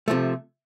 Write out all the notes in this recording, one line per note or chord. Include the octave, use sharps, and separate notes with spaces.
C3 F3 A3